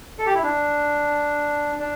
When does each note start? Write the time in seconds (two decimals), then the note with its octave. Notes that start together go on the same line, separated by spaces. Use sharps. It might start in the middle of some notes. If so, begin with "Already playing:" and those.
0.19 A4
0.26 G4
0.35 E4
0.43 D4
1.79 D4